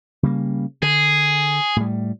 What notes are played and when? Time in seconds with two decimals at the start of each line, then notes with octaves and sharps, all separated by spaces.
0.23 C#3 G3 A#3
0.82 D3 G#4
1.76 A2 G3